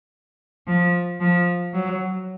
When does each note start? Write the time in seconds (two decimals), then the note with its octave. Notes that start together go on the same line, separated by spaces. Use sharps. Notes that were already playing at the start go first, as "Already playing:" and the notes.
0.67 F3
1.21 F3
1.74 F#3